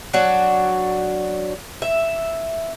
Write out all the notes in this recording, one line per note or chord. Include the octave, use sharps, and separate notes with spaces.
F#3 D4 F#4
E5